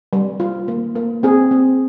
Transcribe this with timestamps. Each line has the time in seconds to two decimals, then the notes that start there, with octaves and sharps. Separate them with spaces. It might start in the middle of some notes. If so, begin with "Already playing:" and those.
0.13 G3
0.40 F4
0.68 A#3
0.95 A#3
1.23 C4 G#4
1.51 C4